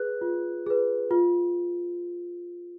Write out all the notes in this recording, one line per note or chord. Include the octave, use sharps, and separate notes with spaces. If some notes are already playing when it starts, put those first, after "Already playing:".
Already playing: G#4 B4 F#6
F4
G#4 B4
F4